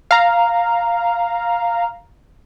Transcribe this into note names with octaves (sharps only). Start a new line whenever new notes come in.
F5 A#5